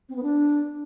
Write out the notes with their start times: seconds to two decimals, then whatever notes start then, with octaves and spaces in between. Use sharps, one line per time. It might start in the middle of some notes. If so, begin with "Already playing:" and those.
0.09 C4
0.16 B3
0.23 D4